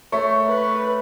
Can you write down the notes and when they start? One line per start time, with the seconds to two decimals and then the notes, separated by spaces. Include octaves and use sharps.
0.12 A3 C#5
0.47 B4